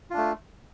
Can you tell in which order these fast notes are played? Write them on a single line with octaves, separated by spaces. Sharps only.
F4 D4 A3